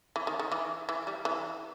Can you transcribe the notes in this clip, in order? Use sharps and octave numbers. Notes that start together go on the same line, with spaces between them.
E3
D#3
D#3
E3
E3
G3
E3